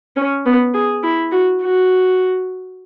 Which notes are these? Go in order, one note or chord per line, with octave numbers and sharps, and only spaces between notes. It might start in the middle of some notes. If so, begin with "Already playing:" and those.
C#4
B3
G#4
E4
F#4
F#4